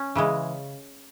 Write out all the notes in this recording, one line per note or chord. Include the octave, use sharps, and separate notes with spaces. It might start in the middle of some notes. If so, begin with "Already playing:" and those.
Already playing: C#4
C#3 E3 G#3